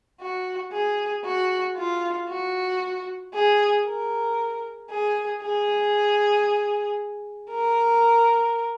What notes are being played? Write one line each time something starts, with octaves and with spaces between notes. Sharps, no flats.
F#4
G#4
F#4
F4
F#4
G#4
A#4
G#4
G#4
A#4